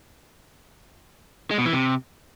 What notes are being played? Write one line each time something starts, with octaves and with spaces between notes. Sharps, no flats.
G#3
B2
E3
C3